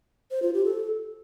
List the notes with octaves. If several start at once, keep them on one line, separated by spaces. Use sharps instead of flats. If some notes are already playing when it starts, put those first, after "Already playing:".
C5
F4
G4
A4